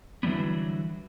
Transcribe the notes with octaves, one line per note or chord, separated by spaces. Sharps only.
D3 E3 F#3 G3 B3